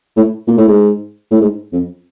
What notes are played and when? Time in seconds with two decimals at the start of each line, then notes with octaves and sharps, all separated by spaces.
0.17 A2
0.47 A#2
0.58 A2
0.68 G#2
1.31 A2
1.41 G#2
1.72 F2